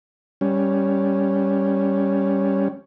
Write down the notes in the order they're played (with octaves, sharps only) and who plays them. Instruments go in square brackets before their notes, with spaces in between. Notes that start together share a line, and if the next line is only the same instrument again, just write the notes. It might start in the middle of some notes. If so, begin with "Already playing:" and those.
[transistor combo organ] G3 C#4